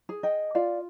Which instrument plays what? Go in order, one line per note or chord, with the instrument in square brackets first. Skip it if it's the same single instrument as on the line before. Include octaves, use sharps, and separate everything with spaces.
[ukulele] G#4
D#5 G5
F4 D5 F5